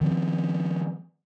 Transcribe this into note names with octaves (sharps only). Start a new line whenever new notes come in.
D#3 F3 C4